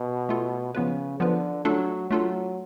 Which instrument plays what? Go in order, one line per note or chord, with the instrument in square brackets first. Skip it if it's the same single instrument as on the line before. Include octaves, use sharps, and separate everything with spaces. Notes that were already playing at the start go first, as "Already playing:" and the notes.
Already playing: [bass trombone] B2
[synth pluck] A3 F4 A4
[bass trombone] C#3 [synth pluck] F3 B3 F4 B4
[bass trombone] D3 [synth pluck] F3 B3 F4 B4
[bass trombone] F#3 [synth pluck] A3 D4 F4 A4
[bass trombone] F#3 [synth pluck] A3 D4 F4 A4